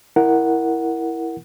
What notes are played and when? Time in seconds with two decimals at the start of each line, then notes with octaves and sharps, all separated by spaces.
0.16 E4 A#4 F#5